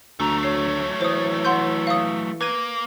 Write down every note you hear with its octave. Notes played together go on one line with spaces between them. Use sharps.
D2 F#3 A3 A#5
C#5 C7
E3 C5 D#6
F#5 C6 G6
F5 D#6
A#3 B4 G#6 D#7